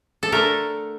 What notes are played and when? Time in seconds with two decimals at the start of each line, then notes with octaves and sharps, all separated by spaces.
0.23 A4
0.32 D3 A3 A#4